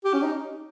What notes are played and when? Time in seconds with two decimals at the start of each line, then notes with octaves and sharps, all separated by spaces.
0.04 G4
0.13 C#4
0.23 D#4